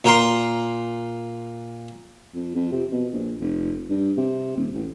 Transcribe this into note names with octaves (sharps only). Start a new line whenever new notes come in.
A#2 A#4 G5 C6
F2
F2
C3
B2
A#1
F1
G2
C3
D#1
A1